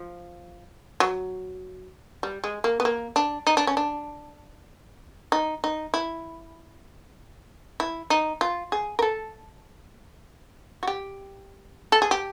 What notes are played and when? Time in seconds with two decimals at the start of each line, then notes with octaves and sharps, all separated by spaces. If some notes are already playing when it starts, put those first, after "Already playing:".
Already playing: F3
1.00 F#3
2.23 G3
2.44 G#3
2.64 A#3
2.80 B3
2.85 A#3
3.16 D4
3.47 D#4
3.57 D4
3.67 C#4
3.77 D4
5.32 D#4
5.64 D#4
5.94 E4
7.80 E4
8.10 D#4
8.41 F4
8.72 G#4
8.99 A#4
9.02 A4
10.83 F#4
10.87 G4
11.92 A4
12.02 G#4
12.11 G4